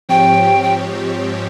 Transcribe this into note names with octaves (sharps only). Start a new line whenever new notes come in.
G#2 F3 C4 G4 C#5 G5
G5